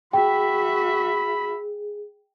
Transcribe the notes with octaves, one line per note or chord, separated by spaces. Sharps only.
F#4 G#4 E5 G5 B5